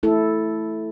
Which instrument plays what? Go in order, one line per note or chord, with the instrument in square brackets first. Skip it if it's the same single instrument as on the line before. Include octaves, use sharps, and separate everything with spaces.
[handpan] A3 E4 A4